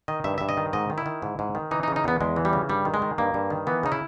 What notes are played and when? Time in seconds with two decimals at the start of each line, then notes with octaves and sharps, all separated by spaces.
0.08 D#3 D#5
0.24 G2 E5
0.38 G2 E5
0.49 D#5
0.57 D#3
0.73 G#2 D#5
0.90 D#3
0.98 E4
1.06 D#3
1.22 G#2
1.39 G#2
1.55 D#3
1.71 E3 D#4
1.83 D#4
1.88 C#3
1.96 D#4
2.04 E2 B3
2.21 E2 G#3
2.36 E3
2.45 G3
2.53 C#3
2.69 G2 G3
2.85 D#3
2.94 G#3
3.02 D#3
3.18 G2 A#3
3.34 G2
3.50 D#3
3.67 E3 B3
3.83 C#3 D#4
3.92 E4